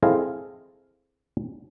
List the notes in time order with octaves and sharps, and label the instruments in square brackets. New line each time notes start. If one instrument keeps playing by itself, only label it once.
[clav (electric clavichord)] C4 E4 G#4 A4 D#5 F5